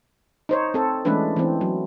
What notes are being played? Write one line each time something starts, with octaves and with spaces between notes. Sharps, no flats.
D#4 C5 C#5
C4 A4
E3 G#3 A3 C#4 D4 B4
E3 C4
F#3